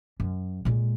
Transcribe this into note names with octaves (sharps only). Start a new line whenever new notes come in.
F#2
A#2 G#3